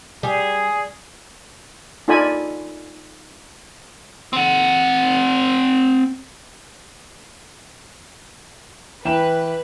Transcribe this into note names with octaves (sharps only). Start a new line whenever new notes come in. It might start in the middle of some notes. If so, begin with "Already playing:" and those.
G3 G#4
D#4 F4 A4 D5 G#5 B5
C4 F#5
E3 B4 G5 E7